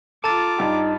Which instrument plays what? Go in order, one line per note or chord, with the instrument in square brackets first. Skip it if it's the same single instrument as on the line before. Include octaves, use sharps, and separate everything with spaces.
[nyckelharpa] F4 D6 [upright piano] A4 [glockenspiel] A5 A#5 A6
[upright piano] G2 G4 [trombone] D#4